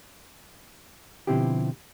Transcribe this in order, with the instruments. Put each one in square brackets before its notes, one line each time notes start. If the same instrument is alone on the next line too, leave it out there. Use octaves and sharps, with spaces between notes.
[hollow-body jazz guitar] B2 D3 F3 C4 E4 G4